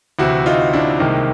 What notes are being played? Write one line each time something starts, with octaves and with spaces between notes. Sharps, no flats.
D2 C3 E3 E4 F#4
D#4 F4
D4 E4
C2 C3 D#3 G#3 A#3